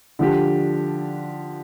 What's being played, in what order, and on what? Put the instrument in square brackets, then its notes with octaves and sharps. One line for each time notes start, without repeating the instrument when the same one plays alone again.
[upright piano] D3 F3 D4 G4